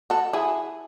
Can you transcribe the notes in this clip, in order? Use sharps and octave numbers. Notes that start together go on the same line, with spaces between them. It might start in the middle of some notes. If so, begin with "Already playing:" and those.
F#4 A4
E4 G#4